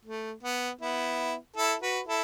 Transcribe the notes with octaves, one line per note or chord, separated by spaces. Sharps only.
A3
B3
B3 E4
E4 A4
F#4 B4
E4 A4